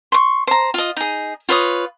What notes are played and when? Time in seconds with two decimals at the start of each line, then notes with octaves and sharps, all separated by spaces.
0.12 C6 C#6
0.47 C5 A#5
0.74 F4 D#5
0.97 D#4 G#4
1.49 F4 B4 C#5 D#6